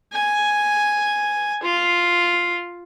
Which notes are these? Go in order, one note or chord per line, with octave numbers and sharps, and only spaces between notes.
G#5
F4